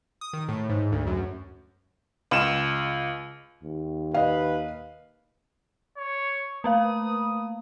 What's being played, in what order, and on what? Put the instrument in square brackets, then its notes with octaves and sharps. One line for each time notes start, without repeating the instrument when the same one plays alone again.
[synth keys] D#6
D#3
A2
G#2
D2
F#2
[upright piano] C#2 E7
[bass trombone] D#2
[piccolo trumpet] B4 [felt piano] D#5 F5
[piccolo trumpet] C#5
[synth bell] A3 A#3 F5 [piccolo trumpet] D#6